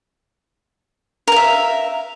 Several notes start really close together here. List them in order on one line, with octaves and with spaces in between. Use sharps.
A#4 F5 E5